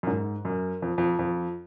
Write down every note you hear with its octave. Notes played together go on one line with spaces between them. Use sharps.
F#2
G#2
F#2
F2
F2
F2